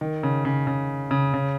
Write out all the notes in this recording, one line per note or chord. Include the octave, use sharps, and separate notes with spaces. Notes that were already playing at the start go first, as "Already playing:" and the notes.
D#3
C#3
C#3
C#3
C#3
C#3